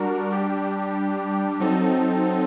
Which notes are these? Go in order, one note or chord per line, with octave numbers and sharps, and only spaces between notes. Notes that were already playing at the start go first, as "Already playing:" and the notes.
Already playing: G3 D4 F#4 A#4
G3 D4 G4
F#3 C4 D#4 A4